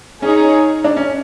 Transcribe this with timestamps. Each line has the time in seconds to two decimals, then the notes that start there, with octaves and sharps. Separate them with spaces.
0.22 C#4 D#4 G#4 C#5
0.84 D4
0.96 C#4